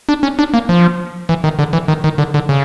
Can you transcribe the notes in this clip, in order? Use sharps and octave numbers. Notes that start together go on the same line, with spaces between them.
D4
C#4
D4
A#3
F3
E3
D#3
D3
E3
D#3
D#3
D3
D3
C#3